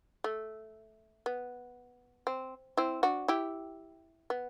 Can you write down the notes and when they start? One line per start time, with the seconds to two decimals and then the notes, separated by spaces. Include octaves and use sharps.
0.24 A3
1.26 B3
2.27 C4
2.77 C4 E4
3.03 D4 F#4
3.28 E4 G4
4.30 B3